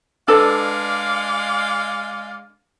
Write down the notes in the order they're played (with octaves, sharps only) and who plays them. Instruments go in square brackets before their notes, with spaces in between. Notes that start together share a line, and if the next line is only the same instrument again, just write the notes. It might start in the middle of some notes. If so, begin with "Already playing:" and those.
[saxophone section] G#3 D5 F5 [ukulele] D4 A4 B4